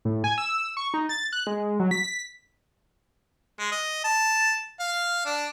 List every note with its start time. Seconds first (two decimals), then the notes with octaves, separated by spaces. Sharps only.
0.05 A2
0.24 G#5
0.38 E6
0.77 C#6
0.94 D#4
1.09 A6
1.33 F#6
1.47 G#3
1.80 F#3
1.91 B6
3.59 G#3
3.72 D#5
4.04 A5
4.80 F5
5.25 D4